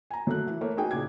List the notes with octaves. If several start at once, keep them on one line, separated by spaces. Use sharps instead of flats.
G#5 A#5
F#3 A3 F#6
E3
A3 A#3 C#5
D#4 F#4 G#4 G5 G#5
A#1 C#3 D6 G#6